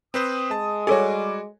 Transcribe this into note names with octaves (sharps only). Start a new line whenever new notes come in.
C4 B4 C5 D#6
G#3 A5
G3 F#4 G#4 A4 C#5 G#5 D6